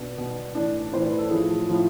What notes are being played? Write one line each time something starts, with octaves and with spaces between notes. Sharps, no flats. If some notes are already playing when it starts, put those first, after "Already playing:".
Already playing: B2 D4
B2
A2 E3 D4
A2 E3 C5
B4
A4
A2 F3 G#4
A2 F3